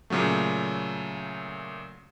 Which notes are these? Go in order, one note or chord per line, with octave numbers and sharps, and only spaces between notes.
A#2 C#3 F#3 A3